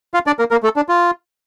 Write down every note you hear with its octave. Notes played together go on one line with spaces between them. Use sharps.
F4 F5
D4 D5
A#3 A#4
A#3 A#4
A3 A4
D4
F4